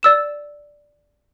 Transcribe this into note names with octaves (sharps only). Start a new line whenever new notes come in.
D5 E6 E7